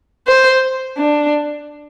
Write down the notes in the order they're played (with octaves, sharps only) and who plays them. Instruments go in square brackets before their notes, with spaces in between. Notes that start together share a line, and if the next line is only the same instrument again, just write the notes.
[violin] C5
D4